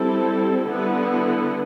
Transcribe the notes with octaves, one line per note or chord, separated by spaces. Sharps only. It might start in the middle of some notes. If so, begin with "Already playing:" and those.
Already playing: G3 C4 E4 A4
D3 G3 B3 E4